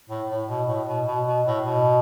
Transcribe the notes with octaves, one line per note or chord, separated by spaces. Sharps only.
A2
A2
B2
A2
B2
B2
B2
A2
B2